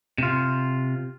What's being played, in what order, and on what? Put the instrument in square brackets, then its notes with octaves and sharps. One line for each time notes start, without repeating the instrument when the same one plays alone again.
[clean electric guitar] C3 F4